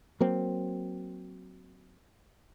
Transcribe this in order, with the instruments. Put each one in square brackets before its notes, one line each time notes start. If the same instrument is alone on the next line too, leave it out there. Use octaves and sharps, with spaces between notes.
[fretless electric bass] F#3 A#3 C4